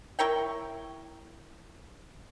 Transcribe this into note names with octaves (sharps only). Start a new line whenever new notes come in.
E4 A#4 C#5 G5